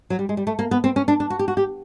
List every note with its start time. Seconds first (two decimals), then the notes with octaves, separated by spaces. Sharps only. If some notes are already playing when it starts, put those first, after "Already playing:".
0.10 F#3
0.19 G3
0.29 G#3
0.37 G3
0.47 A3
0.59 A#3
0.71 B3
0.84 C4
0.96 C#4
1.08 D4
1.20 D4
1.30 F#4
1.39 G4
1.48 F#4
1.57 G4